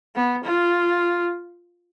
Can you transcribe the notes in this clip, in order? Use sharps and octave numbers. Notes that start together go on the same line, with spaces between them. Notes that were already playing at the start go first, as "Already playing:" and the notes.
B3
F4